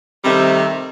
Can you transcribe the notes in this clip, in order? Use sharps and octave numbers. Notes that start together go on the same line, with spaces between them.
C3 D#3 G3 A3 C4